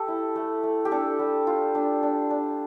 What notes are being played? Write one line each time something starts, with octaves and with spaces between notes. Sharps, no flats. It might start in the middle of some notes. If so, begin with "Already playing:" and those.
Already playing: G4 A4
E4
A3
A3
G4
D4 A4
G3
F4
D4
D4
D4